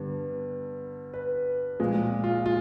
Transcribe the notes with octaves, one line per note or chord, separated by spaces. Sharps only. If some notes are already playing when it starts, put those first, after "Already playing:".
Already playing: G2 D3 G3 B3
B4
A#2 F3 G#3 F4
F4
F4